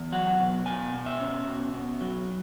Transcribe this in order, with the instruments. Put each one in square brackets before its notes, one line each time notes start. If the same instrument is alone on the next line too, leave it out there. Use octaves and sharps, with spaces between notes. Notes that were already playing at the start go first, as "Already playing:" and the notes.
Already playing: [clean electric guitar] E2
F#3 F#5
B2
B2 G#5
B2
E5
C#4
B2
B2
F#3